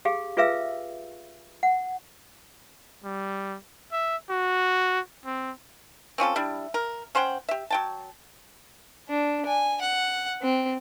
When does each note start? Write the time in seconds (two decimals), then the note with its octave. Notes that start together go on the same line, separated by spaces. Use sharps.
0.05 G4 G#4 F5
0.37 F4 G#4 B4 E5 F5 E6
1.63 F#5
3.04 G3
3.92 E5
4.30 F#4
5.26 C4
6.18 C4 C#4 F4 A4
6.36 G3 D4 E4
6.74 A#4
7.15 C#4 C5 F#5 G5
7.49 G4 E5
7.70 F#3 G5 A5
9.09 D4
9.46 G#5
9.82 F#5
10.42 C4